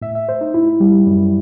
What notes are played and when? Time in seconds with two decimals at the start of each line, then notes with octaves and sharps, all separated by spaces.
0.01 A2 E5
0.15 E5
0.28 A2 C5
0.41 D#4
0.54 A2 E4
0.80 G3
1.07 F#2